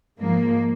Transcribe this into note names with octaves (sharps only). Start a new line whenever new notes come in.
G#2 F3 G#3 A#3